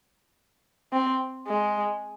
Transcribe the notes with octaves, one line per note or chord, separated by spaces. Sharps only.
C4
G#3